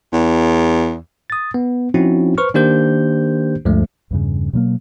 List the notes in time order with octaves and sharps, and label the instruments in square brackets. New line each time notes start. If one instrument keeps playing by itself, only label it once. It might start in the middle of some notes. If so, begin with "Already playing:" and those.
[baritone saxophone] E2
[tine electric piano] D#6 A6
B3
F3 C4 C#4 D#4 E4 F#4
B4 C5 C#6 F6
D#3 A#3 D4 G4 C5 G6
D2 G2 F3 G#3 A3
[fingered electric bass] E2 G2 C#3
B2 F#3 G#3 A#3